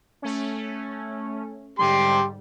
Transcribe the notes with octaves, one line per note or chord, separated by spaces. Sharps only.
A3 C#4
G#2 D3 G3 G4 C6